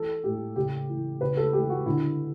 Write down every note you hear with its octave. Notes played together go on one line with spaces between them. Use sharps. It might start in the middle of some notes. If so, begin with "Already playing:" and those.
Already playing: E3 A4
A2 G4
C#3 G4
E3
C#3 B4
A4
E3 G4
F#4
D3 E4